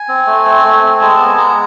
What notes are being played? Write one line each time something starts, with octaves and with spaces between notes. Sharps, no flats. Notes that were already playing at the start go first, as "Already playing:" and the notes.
Already playing: G#5
C4
A3
C4
A3
C4
G#3 A5
B3 G#5
A5
G#3 A#5